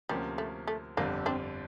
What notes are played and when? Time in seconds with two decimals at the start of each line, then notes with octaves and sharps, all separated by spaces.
0.09 D2 C3 F3 G3 A#3 C#4
0.38 A3
0.68 A3
0.97 G1 F2 D3 G3 A#3
1.26 C4 D4